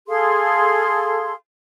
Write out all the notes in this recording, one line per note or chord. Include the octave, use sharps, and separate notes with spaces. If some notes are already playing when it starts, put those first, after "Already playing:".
G#4 A4 F5 C6